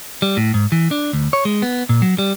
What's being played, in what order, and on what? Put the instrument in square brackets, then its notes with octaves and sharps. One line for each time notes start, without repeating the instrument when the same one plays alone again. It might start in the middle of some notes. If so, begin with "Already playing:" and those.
[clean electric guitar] G3
A2
G#2
E3
D4
D2
C#5
G#3
B3
A#2
F#3
G3